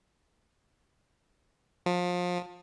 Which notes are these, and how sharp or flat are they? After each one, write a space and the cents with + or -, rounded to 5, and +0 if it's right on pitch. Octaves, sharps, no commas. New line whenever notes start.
F3 +30